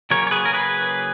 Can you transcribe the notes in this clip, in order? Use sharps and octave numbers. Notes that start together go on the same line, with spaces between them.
C#3 F#3 A#3 C#4 A#4 C#5
C#5
G#4 B4
A#4
G#4 B4